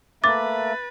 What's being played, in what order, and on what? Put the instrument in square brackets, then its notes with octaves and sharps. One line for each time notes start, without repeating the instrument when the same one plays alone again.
[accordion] A3 A#3 E5 [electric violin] B4 [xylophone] D6 [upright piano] A6